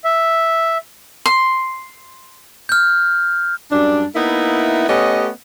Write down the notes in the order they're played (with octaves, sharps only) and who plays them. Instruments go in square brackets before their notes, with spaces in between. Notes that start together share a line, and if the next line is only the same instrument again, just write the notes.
[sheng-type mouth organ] E5
[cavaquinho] C6
[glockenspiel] F6 G6
[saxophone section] F#2 G3 D4
A#3 B3 D#4 E4
A3 B3 C#4 G4 D#5